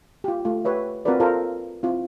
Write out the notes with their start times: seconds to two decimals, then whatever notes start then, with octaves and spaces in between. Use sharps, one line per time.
0.24 F4 G4
0.45 A3 F4
0.65 G4 B4 C#5 E5
1.05 C4 F4 F#4 A#4 B4 D5
1.20 F4 A4 A#4 C5
1.83 C4 E4 F4